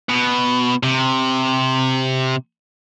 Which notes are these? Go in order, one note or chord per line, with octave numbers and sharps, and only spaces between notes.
B2
C3